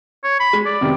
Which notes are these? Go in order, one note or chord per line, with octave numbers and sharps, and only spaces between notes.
C#5
B5
G#3
D5
F1 C3 D#3